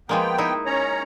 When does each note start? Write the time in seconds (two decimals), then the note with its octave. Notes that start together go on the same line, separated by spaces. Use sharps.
0.09 F3 G#3 A#3 B3 G5
0.38 D#4 E4
0.66 C#4 C#5 A#5